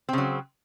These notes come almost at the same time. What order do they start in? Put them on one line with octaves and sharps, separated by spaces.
C4 C#3 F#3